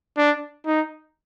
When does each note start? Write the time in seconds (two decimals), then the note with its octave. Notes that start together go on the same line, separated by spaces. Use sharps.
0.17 D4
0.66 D#4